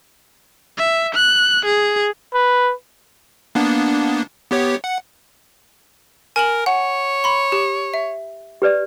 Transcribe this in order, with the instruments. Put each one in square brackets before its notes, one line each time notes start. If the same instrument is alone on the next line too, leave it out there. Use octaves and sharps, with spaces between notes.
[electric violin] E5
F#6
G#4
[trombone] B4
[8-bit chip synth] A#3 B3 D4
B3 G4 C#5
F#5
[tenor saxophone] A#4 [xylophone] G#5 E7 F#7
[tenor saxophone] C#5 [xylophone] F#5
[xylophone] B5 C6
G4
E5
[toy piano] G4 B4 D5